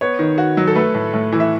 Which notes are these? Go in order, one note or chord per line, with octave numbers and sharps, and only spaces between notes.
B3 C#5
D#3
F#4
F#3
A4
A3 B4
A2
A2
E3
E5